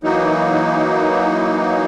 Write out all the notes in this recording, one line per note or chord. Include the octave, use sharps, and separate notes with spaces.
E3 F#3 A#3 D#4